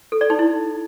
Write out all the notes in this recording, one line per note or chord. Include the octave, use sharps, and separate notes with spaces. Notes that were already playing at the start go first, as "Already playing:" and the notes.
A4
D5
D#4
E4